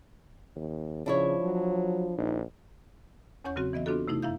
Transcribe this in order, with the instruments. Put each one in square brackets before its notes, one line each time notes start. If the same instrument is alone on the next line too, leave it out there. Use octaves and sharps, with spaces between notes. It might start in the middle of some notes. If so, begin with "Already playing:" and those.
[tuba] D#2
[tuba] C#3 [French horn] F3 [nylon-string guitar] D4 E4 C#5
[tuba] F#3
[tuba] A#1 [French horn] D#4
[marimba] E2 C#4 C#5 F#5 C#6 G6
C#3 F#3 C4 F#4
E3 B3 D#5 E5
B3 C4 D4 F4 F#4 A4
C3 A3 D#4 E4
F#2 E4 E5 F5 G6